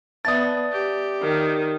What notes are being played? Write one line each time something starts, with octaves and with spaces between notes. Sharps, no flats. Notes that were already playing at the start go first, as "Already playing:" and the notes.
B3 D5 E5 A5 D#6 A6
G4
D#3